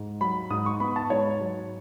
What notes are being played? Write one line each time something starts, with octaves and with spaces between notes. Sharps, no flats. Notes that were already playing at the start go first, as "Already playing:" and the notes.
Already playing: G#2
F#3 B5
G#2 D#6
C#6
B3 B5
A5
G#2 C#5
F#3